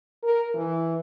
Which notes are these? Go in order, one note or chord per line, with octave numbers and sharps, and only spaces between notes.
A#4
E3